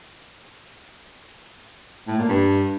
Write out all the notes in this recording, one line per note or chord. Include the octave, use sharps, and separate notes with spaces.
A2
A#2
G2